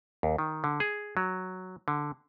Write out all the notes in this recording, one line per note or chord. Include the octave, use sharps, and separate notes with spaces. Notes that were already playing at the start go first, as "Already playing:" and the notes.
D#2
D#3
D3
G#4
F#3
D3